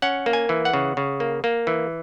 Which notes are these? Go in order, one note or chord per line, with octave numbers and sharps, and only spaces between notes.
C#4 F#5
A#3
G#5
E3
F#5
C#3
C#3
A#3
A#3
E3